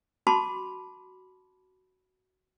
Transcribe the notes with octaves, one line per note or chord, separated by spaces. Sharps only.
F#4 A5 B5 C6 D6